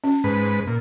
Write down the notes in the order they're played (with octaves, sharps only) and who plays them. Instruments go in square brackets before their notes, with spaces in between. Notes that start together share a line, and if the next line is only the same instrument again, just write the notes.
[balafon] C#4
[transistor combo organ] G#2 B4
A#2